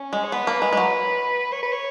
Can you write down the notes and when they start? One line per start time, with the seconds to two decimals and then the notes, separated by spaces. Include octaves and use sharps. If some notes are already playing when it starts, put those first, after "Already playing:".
Already playing: C#4
0.13 G#3
0.24 C#5
0.32 B3 B4
0.47 A#3
0.62 G#3
0.73 G#3
0.77 F#3
1.52 C#5
1.62 B4
1.72 C#5